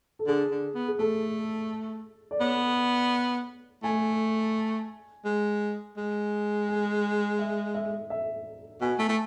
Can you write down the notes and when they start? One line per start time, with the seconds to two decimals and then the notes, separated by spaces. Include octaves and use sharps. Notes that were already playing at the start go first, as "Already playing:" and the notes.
0.19 A4
0.27 D3 G#4
0.51 D3
0.74 B3
0.88 G#4
0.99 A3 A4
2.31 D5
2.40 B3 C#5
3.83 A3 G#5
5.25 G#3
5.97 G#3
6.68 G#5
7.39 E5
7.75 E5
8.10 E5
8.81 B2 G#5
8.98 A3
9.08 A3